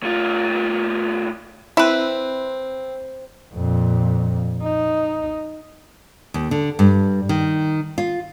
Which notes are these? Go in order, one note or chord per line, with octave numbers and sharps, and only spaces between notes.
A2 F4
C4 E4 B4
F2 A#2
D#4
D#2
D3
G2
D#3
F4